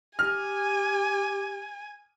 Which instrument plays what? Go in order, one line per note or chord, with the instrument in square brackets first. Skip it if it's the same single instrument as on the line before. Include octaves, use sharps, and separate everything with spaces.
[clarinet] G4 [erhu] G#5 [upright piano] F6